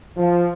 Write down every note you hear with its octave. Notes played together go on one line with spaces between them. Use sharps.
F3